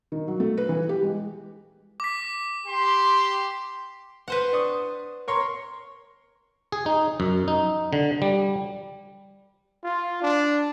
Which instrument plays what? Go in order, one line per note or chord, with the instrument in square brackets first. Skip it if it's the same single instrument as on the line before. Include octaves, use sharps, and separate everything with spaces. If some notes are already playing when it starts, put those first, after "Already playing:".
[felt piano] D#3
F#3
A3
B4
E3
G4
G#3
[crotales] D6 B6
[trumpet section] G4 C6
[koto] B4 C5 F#5
[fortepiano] D4 C#6 D#6
A#4 C#5 C6
[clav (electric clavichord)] G#4
D#4
F#2
D#4
D3
G3
[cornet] F4
D4